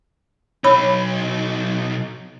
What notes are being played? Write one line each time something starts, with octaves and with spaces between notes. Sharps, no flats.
B1 D#4 C#5 B5